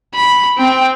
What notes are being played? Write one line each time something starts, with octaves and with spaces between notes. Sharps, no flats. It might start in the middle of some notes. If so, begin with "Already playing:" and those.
B5
C4 G5